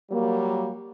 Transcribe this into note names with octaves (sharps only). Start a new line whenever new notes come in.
F#3 G3 A#3